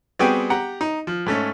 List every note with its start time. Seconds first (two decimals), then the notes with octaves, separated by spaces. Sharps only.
0.19 G3 B3 C4 F#4 G#4 G5
0.50 G4 F#5 A#5
0.81 D#4
1.07 F3
1.26 G#2 A3 C#4